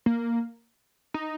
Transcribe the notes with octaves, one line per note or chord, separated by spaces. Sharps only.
A#3
D#4